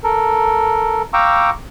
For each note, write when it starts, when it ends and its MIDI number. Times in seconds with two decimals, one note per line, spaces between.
0.04 1.02 69
0.04 1.02 70
1.13 1.50 77
1.13 1.50 79
1.13 1.50 82
1.13 1.50 85
1.13 1.50 86
1.13 1.50 88